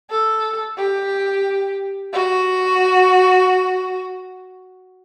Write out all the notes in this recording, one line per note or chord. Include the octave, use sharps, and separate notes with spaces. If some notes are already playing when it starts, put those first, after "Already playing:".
A4
G4
F#4